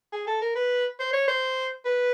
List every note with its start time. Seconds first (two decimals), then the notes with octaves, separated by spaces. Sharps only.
0.12 G#4
0.27 A4
0.41 A#4
0.55 B4
0.99 C5
1.13 C#5
1.28 C5
1.85 B4